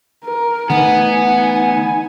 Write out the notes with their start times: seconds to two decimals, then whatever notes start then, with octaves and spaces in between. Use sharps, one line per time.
0.25 A#4
0.70 D3 E3 A3 B3 D#4 F#5 G#5
1.25 D#4 G#5